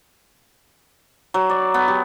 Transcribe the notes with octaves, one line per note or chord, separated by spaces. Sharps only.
F#3
D5
B3
G4